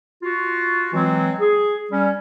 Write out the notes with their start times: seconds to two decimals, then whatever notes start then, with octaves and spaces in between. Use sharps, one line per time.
0.23 F4 F#4
0.93 E3 F#3 G#3 C4
1.40 G#4
1.91 G3 C#4